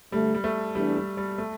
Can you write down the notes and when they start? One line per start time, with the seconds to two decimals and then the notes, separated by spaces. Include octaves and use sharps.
0.12 D2 D3 G3 A3
0.34 G3
0.44 A3
0.75 E2 E3 G3 A3 D4
0.97 G3
1.17 G3
1.38 A3